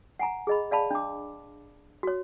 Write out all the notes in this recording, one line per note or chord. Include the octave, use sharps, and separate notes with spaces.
F#5 G#5 A#5
G#4 D#5 B5
D5 F5 A5 B5
D4 D6
F#4 C#5